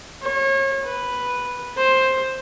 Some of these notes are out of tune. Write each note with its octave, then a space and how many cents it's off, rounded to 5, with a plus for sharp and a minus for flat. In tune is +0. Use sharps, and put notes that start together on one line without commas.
C#5 -35
B4 +0
C5 +10